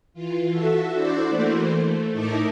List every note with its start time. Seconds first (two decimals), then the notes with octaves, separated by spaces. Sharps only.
0.14 E3 F4
0.49 F#4 A4 E5
0.92 D4 E4 F#4 C5 D5
1.28 E3 A3 A#3 C5
1.81 A3
2.11 A2 D#4 E4 A#4 A5 D6